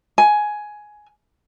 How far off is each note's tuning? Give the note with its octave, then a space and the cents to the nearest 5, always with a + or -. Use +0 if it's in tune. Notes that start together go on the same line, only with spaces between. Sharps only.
G#5 +10